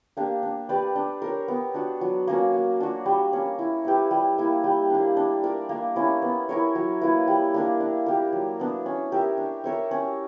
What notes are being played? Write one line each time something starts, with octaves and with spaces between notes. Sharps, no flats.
A#3 D4 G4
D4
G4 B4 D5
D4
A#4 C#5
B3
D4 F#4
F#3
A#3 C#4 F#4
A#3
D4 F#4
G3
A#3 C#4
E4
G4 B4 E5
G3
A#3 E4
G3
A#3 D4
D4
A#4 D5
A#3
C#4 E4
B3
E4 A#4 C#5
F#3
A#3 E4 B4
G3
A#3 D4 A#4
D4
G4 A#4
F#3
B3 D4
C#4
G4 A#4 E5
D4
A#4 C#5 E5
C#4